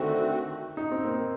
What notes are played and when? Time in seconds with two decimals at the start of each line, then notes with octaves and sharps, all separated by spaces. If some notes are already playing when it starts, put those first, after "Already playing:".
Already playing: D3 D#3 A3 C4 F#4
0.77 D#4
0.92 C4
1.05 A#3